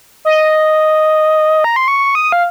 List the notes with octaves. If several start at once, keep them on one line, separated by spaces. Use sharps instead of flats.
D#5
A#5
C6
C#6
D#6
F5